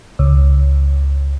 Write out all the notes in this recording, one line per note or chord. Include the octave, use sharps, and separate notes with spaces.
C#2